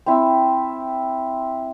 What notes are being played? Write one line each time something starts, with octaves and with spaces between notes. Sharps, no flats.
C4 E4